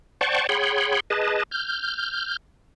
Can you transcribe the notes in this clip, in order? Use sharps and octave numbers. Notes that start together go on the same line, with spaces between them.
C5 D5 F#5 G5 A5 C#6
G#4 C#5 F#5 G5 B5 C6
G#4 B4 D#5 A5
F6 G6